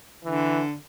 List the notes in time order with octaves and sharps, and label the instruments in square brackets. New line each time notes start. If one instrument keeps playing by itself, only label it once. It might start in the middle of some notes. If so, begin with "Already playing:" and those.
[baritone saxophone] D3 [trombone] E3